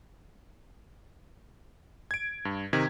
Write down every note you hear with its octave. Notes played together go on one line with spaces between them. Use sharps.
G#6 D7
G2
C3 D#3 G#6